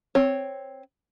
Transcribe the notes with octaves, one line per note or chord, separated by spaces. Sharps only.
C4 C#5